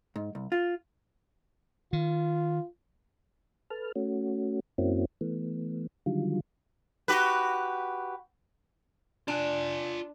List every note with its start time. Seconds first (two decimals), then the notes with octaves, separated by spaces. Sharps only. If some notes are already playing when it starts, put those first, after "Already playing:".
0.16 G#2
0.35 C2
0.52 F4
1.93 D#3 F4
3.70 A4 B4 A5 F6
3.96 A3 C#4 F#4
4.78 F#2 A#3 C4 C#4 E4 F#4
5.21 E3 A3 B3
6.06 D3 D#3 F#3 G3 F4
7.08 F#4 G4 B4
9.28 D4 F4 G#5